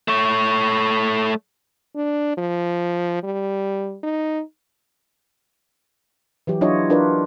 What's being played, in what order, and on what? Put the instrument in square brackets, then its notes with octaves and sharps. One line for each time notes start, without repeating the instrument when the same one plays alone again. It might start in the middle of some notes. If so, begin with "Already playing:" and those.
[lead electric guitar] A3 C#5
[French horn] D4
F3
G3
D#4
[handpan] E3 F#3 G4
F#3 D4 E4 F4 C#5 D#5
D4 F4 A#4 B4 D5